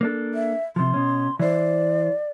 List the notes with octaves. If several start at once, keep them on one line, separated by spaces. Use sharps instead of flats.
A#3 D4 A4
E5
C3 F3 C6
B2 C#4
E3 C5 D5